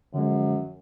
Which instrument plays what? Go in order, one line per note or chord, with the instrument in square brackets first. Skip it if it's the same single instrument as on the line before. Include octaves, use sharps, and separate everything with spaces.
[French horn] F#2 [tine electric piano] D3 F3 G#3